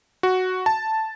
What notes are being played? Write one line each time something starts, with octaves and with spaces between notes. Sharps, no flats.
F#4
A5